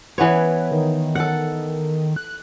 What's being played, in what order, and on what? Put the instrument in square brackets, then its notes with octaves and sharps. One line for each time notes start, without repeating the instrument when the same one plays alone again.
[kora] E3 B3 C#5 [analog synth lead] B4
[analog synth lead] D#3
[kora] A4 F#5
[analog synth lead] F#6